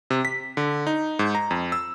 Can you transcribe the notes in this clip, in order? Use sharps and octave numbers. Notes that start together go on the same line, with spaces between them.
C3
B6
D3
D#4
G#2
A#5
F2
E6